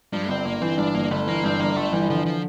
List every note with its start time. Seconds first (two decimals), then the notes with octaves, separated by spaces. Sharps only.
0.13 G2 F3
0.29 G1 C4
0.45 G1 A#3
0.62 E3 C4
0.78 G2 D4
0.94 G1 A#3
1.11 G1 A3
1.27 E3 A#3
1.44 G2 C4
1.60 G1 A#3
1.77 G1 A3
1.93 E3 G3
2.09 D3 F3
2.26 F3